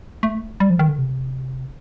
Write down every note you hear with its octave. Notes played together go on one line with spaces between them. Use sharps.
A3
G3
F3
D#3
D3
C3